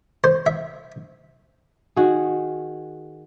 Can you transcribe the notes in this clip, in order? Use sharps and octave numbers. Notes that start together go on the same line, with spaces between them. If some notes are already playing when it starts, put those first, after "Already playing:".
C5
E5
D#3 F#4 G#4